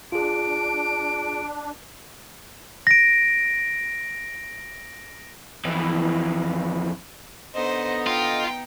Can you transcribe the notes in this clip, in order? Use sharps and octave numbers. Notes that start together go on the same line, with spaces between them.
D4 F4 G#4 D7
A#6 D7
F2 E3
D3 B3 D#4 C5 D#5
F4 G5